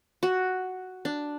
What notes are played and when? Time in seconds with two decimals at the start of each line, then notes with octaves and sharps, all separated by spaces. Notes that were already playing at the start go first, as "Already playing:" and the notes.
0.23 F#4
1.05 D4